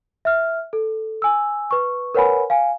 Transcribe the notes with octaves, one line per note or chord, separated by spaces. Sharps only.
E5 F6
A4
G#5 E6
B4 C#6
A#4 B4 C#5 F#5 G#5 B5
F5 G#5